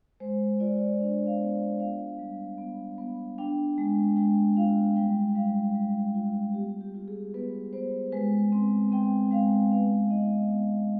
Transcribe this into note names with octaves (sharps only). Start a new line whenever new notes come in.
G#3 C5
F4 D5
D4
F5
B3
B3 F5
G3
B3
B3
D4 G5
G#3
G#3 G5
F4 F5
G3 G5
G3 F5
G3
F4
B3 G4
G4
F4
G#4
B3 B4
B3 C5
G#3 B4
C4 B4
C4 G5
G#3 F5
B3 F5
D#4 D#5
B3 D#5